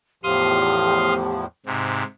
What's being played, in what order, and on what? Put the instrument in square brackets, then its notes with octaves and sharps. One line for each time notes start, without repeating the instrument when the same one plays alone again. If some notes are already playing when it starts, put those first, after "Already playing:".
[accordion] E2 A2 F3 [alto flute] G4 [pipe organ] F5 C6 D#6
[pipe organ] G#2 C3